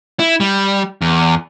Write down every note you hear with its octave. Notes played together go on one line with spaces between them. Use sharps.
E4
G3
E2